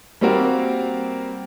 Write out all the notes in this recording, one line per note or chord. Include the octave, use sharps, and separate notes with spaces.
G3 A#3 C4 F#4 A#4